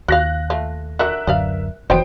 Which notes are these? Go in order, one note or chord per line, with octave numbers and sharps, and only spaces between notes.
D#2 F#4 F5 F#6 A#6
A3 F4
D3 F#4 A#4 E5 F#6
D1 F#2 D3 B4 D5 F5
F1 B2 E3 F#3 B3 C5 G5 D7